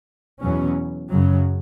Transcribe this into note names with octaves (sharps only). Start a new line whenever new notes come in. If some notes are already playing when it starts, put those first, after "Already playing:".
E2 B2 F#3 C#4
F#2 C#3 F#3